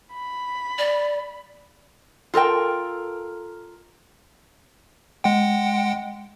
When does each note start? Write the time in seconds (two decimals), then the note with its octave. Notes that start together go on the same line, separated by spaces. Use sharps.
0.12 B5
0.78 D5
2.34 F4 A4 A#4 G5
5.24 G#3 F#5 G5